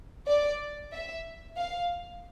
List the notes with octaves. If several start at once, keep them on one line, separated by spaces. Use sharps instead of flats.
D5
E5
F5